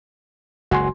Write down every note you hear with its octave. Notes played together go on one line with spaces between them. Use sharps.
F#1 C#2 F#4 G#5 C6